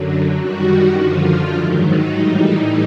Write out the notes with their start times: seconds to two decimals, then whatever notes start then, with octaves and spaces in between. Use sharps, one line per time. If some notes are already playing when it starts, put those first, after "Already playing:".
Already playing: F#2 D3 F#3
0.35 F#2 D#3 G3 F#4
0.95 F#2 D3 F3 F4
1.54 G#2 D#3 F#3 E4
1.84 D#4
2.15 A2 E3 G3